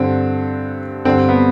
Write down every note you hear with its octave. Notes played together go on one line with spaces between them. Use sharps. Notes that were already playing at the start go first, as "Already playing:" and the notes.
Already playing: G2 D3 C4
G2 D3 C4
B3